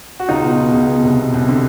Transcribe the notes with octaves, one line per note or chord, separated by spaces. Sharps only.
F#4
C#2 D#4 F4
B2
B2
C#2
B2
C2
B2
C2
D3